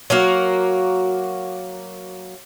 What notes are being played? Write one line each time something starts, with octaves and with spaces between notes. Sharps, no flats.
F#3 A#3 F#4